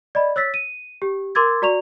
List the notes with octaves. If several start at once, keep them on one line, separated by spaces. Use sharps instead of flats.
D5 D#5 B5
C#5 E6 A6 B6
D#7
G4
A#4 C6 D6 E6 G#6 A6
F#4 D5 A#5 C#6 F7